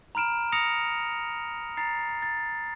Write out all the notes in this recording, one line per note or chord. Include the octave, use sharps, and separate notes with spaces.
A#5 B5 F6 D7 E7
D#6 A#6 C#7 F7
A#5 A6 C7
A6